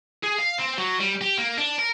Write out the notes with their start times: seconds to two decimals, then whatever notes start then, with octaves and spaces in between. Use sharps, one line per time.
0.23 G#4
0.38 F5
0.58 C4
0.78 F#3
1.00 G3
1.21 G4
1.38 A#3
1.58 D4
1.79 A#4